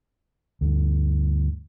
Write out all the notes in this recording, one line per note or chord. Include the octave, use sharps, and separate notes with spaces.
D2 G2